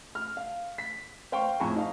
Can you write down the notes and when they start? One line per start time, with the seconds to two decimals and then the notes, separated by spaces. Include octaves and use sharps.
0.15 F6
0.37 F5
0.78 B6
1.32 C5 F5 G5 C#6
1.60 F2 A2 G#4 G#5 A#5 C#6
1.76 D#4 F5